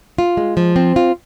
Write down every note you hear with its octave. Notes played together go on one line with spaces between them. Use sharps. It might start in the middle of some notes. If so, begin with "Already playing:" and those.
F4
G#3
F3
C4
F4